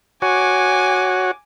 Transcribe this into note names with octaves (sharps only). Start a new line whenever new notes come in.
F#4 C#5 G#5 D6